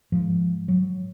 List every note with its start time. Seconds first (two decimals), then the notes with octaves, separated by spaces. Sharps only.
0.12 G#2 F3
0.68 F#3